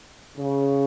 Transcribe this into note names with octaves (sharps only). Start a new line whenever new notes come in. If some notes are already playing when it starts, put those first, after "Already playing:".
C#3